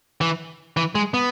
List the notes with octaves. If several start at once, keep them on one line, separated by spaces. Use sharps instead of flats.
E3
E3
G#3
B3